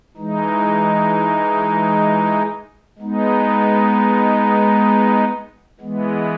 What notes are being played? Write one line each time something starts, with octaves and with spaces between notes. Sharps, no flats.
E3 G#3 D#4
G#3 B3 D#4
E3 G#3 B3